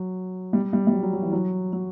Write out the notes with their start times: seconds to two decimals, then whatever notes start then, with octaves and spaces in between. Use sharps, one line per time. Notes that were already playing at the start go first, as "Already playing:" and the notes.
Already playing: F#3
0.53 G3
0.73 G3
0.87 G3
0.92 F#3
1.03 F#3
1.13 F#3
1.22 E3
1.33 F#3
1.73 F#3